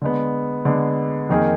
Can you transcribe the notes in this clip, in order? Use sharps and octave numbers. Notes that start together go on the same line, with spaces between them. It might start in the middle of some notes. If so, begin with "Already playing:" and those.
D3 G#3 B3
D3 G#3 B3
F2 D#3 A#3 D#4 G#4